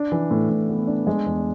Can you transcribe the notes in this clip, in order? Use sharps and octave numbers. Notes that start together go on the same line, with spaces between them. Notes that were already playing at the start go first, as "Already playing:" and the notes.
Already playing: D4
E3
A2
A2
B3
D4
G#3
E2